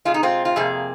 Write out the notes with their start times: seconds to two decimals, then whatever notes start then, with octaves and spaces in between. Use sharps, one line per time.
0.05 C3 G#3 F4
0.14 D#4
0.23 C4 F4
0.45 F4
0.56 F2 C3 A#3 G#4